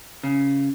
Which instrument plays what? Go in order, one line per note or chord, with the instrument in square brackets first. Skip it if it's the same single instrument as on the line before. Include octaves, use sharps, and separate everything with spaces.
[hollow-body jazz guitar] C#3